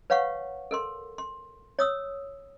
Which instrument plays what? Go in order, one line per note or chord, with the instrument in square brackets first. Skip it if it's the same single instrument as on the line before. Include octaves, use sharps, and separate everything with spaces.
[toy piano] B4 C#5 F5 F#5 C#6
A4 A#4 C6
C6
C#5 D#6 E6